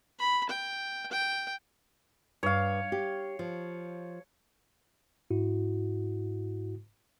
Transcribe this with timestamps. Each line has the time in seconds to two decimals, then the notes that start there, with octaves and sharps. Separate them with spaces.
0.19 B5
0.49 G5
1.12 G5
2.43 G2 C#5 F5
2.92 G4
3.39 F3
5.30 G#2 E4 F#4